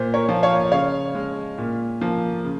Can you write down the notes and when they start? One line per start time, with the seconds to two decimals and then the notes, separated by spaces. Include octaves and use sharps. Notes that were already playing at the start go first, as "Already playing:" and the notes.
Already playing: A#2 C5
0.14 A#4 C#5
0.29 F3 A#3
0.43 C#5 F5
0.72 C#3 C#5 F5
1.15 G#3
1.58 A#2
2.01 F3 A#3
2.44 C#3